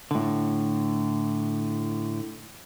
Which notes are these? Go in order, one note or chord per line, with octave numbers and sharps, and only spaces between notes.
A2 D3